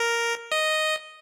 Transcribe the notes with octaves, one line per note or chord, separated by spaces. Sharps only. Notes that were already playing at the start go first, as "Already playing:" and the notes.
Already playing: A#4
D#5